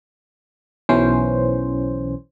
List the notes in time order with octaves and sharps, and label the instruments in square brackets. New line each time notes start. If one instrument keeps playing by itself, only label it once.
[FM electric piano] B1 E3 C#4 C5